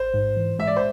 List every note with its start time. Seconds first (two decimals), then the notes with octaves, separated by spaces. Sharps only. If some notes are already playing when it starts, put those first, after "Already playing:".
Already playing: A1 C5
0.14 G#2
0.37 E3
0.59 G#3 E5
0.67 D5
0.77 C5